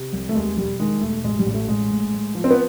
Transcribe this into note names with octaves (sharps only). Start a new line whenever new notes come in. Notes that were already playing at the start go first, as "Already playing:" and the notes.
Already playing: C3
C2
A3
D#2 G#3
E1 G3
D#3 G#3
E1 A3
A1 G#3
G3
A1
A3
A1 G#3
A2
A2
F3
C4
B3